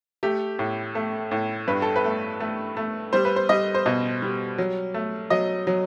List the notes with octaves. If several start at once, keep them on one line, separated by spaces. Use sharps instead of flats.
A3 G4
A2
A3
A2
G2 B4
A4
B4
A3
A3
A3
G3 C5
B4
C5
G3 D#5
C5
B2 D#5
G3
F#3
A3
F#3 D#5
F#3